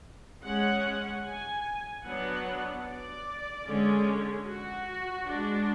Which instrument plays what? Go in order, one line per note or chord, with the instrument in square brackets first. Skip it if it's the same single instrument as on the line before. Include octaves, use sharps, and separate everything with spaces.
[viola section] G#3 C#4 F#5
G#5
F#3 B3 D4 F#5
D5
D3 G#3 C#4
F#4
G#3 D4